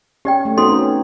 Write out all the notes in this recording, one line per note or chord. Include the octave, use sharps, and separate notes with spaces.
C#4 G4 D5 G5
A3
B3 C4 D#4 F#4 A4 C6
C#4